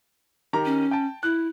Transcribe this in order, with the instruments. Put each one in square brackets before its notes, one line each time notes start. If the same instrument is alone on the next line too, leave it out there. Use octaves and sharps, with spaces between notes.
[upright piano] D#3 G4 A#5
[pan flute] C#4
[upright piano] G5 A5
[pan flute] E4 [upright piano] F#6